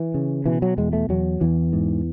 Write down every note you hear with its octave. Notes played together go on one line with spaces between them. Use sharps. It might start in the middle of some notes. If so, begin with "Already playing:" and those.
Already playing: E3
C#3
B2 E3
F#3
E2 G#3
A3
E2 F#3
E2 E3
G#2